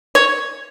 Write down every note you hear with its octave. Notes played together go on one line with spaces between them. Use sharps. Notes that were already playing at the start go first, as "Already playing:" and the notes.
C#5